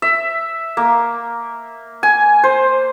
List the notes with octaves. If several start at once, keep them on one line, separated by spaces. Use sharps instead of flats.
E5
A#3
G#5
C5